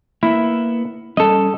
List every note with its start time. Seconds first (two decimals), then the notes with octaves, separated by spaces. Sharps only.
0.23 A#3 B3 E4 E5
1.17 G3 C#4 A4 D#5